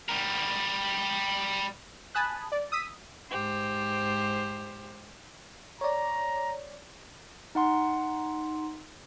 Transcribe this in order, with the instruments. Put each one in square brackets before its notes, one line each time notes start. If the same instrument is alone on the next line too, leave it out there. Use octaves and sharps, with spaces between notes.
[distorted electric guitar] G3 A#4
[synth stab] G#5 A5 B5 D#6 F#6
D5
D#6 E6 B6
[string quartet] G#2 G4 C5
[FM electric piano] C#5 D5 [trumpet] A#5
[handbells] D#4 F#5 C6